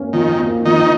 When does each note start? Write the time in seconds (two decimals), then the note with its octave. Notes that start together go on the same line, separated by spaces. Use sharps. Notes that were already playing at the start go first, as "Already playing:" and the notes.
Already playing: A#3 C#4
0.13 D#3 F3
0.39 A#3
0.65 D#3 F3 D#4